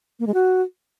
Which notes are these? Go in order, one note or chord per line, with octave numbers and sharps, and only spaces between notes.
A#3
G#3
F#4